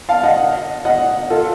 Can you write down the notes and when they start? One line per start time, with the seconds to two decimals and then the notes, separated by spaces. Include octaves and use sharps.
0.09 F5 A5
0.24 D#5 F#5
0.85 D#5 F#5
1.30 F4 A4